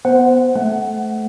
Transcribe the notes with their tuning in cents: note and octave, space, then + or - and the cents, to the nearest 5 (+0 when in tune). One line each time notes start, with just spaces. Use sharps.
B3 +0 C5 -15 F#5 +0
A3 -15 F#5 +20